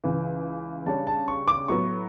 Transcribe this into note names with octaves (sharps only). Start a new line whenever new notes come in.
C#2 C#3 E3
C#3 G3 D4 G4 C#5 A5
A5
C#6
D6
A2 F#3 B3 F#4 C#6